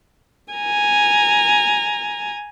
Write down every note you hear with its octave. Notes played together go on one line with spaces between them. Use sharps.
G#5 A#5